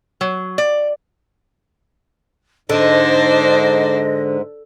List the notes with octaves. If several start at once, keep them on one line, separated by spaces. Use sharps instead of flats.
F#3
D5
G#2 D3 D4 C5 D#5